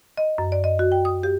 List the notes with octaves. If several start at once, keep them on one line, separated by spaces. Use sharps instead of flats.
D#5
F#2
D5
D#5
F#4
G5
D#6
G4